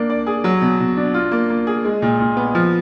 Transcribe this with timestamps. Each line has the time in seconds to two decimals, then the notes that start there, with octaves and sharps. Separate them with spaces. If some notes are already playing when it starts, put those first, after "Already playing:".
Already playing: A#3 D4
0.10 D5
0.27 G#4
0.44 F#3
0.62 B2
0.80 B2
0.97 D4
1.14 F4
1.32 A#3
1.50 A#3
1.67 G#4
1.85 G#3
2.02 A#2
2.20 A#2
2.37 B3
2.55 F3